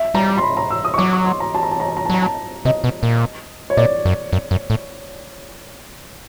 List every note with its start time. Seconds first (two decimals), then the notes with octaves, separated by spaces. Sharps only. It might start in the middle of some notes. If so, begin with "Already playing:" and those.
Already playing: E5
0.14 G3 A#5
0.38 C6
0.42 B5
0.57 A#5
0.70 E6
0.85 D#6
0.94 C#6
0.98 F#3 D6
1.13 C#6
1.26 C6
1.40 A#5
1.55 A5
1.63 A#5
1.71 A5
1.80 A#5
1.88 A5
1.97 A#5
2.06 A5
2.10 F#3 A#5
2.22 A5
2.65 C3 D#5
2.84 B2
3.03 A#2
3.70 C#5
3.77 A#2 D5
4.05 F#2
4.33 F#2
4.51 F#2
4.70 A2